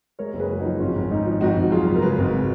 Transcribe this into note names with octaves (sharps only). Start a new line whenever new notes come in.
G#3 A#4 C#5
F#1
G#4 B4
F#2
D#4 F#4
F3
G#1 C#4 F4
G#1
G#2 D#4
F3
G#1 D#4 F#4
G#1
F#2 F4 G#4
C#3
A#4
G#3 G#4 B4
G#1